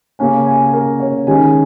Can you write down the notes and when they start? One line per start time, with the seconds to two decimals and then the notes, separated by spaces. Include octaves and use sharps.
0.19 C#3 A#3 C#4 G#5
0.46 G#5
0.73 A#4
1.00 C#5
1.27 D#3 G#3 C#4 G#5